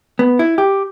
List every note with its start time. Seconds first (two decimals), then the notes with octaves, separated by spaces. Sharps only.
0.19 B3
0.39 E4
0.58 G4